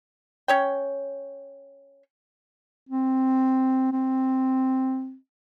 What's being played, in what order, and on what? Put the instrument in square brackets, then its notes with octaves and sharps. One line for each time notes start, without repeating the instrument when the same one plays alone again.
[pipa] C#4 C#5 G5
[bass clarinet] C4
C4